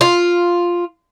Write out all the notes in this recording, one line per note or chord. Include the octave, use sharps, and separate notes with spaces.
F4